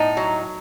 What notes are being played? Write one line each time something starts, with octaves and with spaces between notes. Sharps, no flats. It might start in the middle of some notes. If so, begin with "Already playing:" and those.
Already playing: A2 D#4
F#3